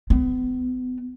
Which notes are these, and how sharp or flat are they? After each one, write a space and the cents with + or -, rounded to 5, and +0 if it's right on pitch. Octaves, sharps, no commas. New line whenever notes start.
B3 +40